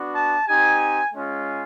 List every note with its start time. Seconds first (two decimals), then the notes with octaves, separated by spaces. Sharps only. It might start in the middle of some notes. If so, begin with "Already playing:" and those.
Already playing: B3 D4 F#4
0.14 A5
0.47 C4 D#4 G4 G#5
1.12 G#3 C#4 F4